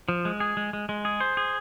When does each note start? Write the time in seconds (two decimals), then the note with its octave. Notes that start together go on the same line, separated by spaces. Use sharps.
0.09 F3
0.25 G#3
0.40 G#4
0.57 G#3
0.73 G#3
0.89 G#3
1.05 G#4
1.20 C5
1.37 G#4